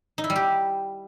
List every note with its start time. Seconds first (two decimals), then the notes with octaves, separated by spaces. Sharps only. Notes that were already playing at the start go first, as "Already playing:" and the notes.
0.18 D#4
0.24 E4
0.30 G3
0.36 G4